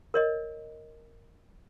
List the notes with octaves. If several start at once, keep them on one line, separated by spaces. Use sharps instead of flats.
A#4 C#5 D#5